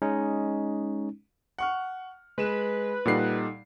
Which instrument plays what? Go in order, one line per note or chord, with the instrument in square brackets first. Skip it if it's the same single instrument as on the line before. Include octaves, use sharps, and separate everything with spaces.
[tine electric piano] G#3 C#4 D#4
[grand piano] F#5 C#6 F6
[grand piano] G#3 E7 [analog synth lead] B4
[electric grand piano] A#2 G3 C7 [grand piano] D#4 A4 F#5